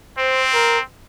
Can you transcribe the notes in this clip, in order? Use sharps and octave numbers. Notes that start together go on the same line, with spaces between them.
C4 C5
A#4